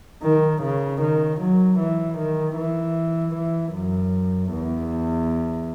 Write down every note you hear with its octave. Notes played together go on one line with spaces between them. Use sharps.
D#3
C#3
D#3
F#3
E3
D#3
E3
E3
F#2
E2